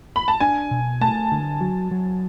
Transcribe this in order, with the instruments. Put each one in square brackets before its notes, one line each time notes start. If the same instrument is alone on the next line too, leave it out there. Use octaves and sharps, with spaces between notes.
[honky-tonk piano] B5
A5
[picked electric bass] D4 [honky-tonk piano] G#5
[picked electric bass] B2
[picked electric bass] A3 [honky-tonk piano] A5
[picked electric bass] D3
F#3
F#3